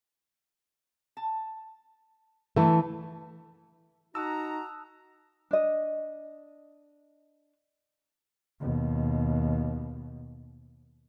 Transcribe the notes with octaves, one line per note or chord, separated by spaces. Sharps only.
A5
E3 A3 D4 F#5 A5
D#4 F#4 A5 A#5 D#6 E6 F#6
D4 D#5
D#2 B2